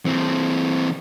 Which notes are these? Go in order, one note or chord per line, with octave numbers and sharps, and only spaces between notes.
E3 C4